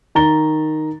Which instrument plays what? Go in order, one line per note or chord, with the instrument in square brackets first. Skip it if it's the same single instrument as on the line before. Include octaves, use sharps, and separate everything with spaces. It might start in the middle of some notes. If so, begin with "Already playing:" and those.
[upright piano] D#3 A#5 A6 G7